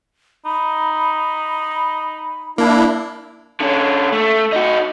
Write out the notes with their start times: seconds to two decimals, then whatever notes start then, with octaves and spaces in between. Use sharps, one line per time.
0.45 D#4 B5
2.58 A#3 D4 E4
3.61 D3 C#4
4.12 A3
4.52 D#4 F#4